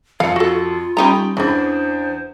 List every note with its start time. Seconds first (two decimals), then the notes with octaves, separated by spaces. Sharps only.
0.20 F2 F4 F5 C#7
0.36 F#4 A4
0.97 G3 C#4 D#4 G5 A#5 B5
1.37 E2 C#3 E3 D4 C5